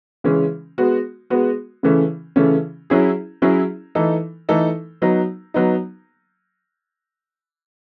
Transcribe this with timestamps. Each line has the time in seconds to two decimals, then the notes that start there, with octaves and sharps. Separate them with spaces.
0.24 C#3 E3 G#3 C#4
0.78 G#3 B3 F#4
1.30 G#3 B3 F#4
1.83 C#3 E3 A3 C#4
2.36 C#3 E3 A3 C#4
2.90 F#3 C#4 E4 G#4
3.42 F#3 C#4 E4 G#4
3.95 E3 A3 D#4 A4
4.49 E3 A3 D#4 A4
5.02 F#3 B3 D#4
5.54 F#3 B3 D#4